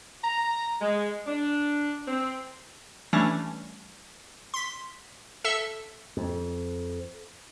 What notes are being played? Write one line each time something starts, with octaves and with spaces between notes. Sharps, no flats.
A#5
G#3
D4
C4
E3 G3 A3 C#4 D4
C6 B6
A4 E5
F2